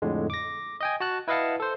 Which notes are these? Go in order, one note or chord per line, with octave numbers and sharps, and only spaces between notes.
F2 A2 D3 G#3
D6 A#6
D#5 G5 G#5
F#4 A5 F#6
E4 B4 D#5 F5 F#5 A5
A4 C5